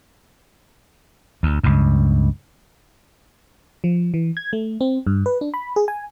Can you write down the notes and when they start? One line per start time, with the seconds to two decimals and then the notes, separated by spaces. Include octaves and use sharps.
1.43 D2
1.64 C#2 G2
3.84 F3
4.14 E3
4.37 G#6
4.53 A3
4.81 C4
5.07 G2
5.26 B4
5.41 D4
5.54 B5
5.76 G#4
5.88 G#5